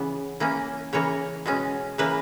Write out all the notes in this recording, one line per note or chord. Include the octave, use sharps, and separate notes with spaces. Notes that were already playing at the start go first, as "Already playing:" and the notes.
Already playing: C#3 E3 B3
E3 A#3 C#4
C#3 E3 A#3 C#5
B2 G#3 C#4
C#3 E3 A#3 B4